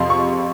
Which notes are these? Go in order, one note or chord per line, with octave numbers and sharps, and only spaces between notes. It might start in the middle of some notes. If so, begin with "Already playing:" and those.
Already playing: F2 C3 F3 C6
C#6